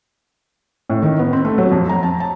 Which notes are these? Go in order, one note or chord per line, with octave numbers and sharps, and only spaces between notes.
A2
D#3
B3
C4
A3
F#3
F2
A#5
A5
A5